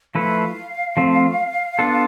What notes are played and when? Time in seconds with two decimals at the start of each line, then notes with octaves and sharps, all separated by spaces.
0.15 F3 A3 E4 B4 F5
0.97 F3 A3 C4
1.79 B3 D4 F4 A4